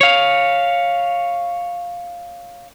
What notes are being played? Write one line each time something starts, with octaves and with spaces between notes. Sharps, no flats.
C#5 F5